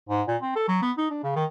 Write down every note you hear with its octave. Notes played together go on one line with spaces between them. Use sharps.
G#2
A#2
C4
A4
F#3
B3
D#4
D4
C#3
D#3